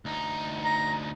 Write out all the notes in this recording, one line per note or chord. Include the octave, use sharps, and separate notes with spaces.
D2 D#4
A#5